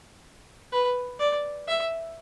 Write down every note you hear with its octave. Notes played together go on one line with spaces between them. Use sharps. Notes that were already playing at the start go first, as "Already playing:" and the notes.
B4
D5
E5